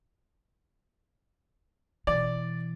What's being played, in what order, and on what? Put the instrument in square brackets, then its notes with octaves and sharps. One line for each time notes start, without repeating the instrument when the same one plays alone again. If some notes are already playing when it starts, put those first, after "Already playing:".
[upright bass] B2 E3 [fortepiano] D5